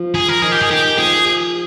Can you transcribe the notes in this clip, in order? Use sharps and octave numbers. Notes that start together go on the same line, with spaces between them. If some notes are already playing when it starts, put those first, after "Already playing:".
Already playing: F3
G#4
A#4
D#3 G#4
G4
G#4
D#3 G4
F3 G#4